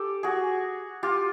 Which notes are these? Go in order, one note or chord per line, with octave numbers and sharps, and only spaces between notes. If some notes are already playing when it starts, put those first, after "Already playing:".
Already playing: G4 A4
F#4 G#4
F4 G4